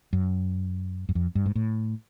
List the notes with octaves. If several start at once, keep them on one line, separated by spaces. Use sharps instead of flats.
F#2
F#2
F2
G2
G#2
A2